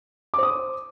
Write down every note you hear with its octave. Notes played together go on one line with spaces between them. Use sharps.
C5 D6 D#6